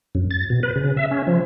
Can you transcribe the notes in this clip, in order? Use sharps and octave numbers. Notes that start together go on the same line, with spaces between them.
F#2
A6
B2
B4
C#3
E5
C#4
F3